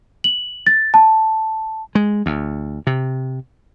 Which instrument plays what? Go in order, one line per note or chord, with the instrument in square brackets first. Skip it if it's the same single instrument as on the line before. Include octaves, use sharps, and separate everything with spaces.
[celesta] F#7
A6
A5
[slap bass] G#3
D2
C3